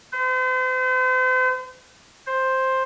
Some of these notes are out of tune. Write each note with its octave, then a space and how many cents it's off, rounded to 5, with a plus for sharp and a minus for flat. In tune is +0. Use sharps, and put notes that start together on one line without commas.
C5 -40
C5 +5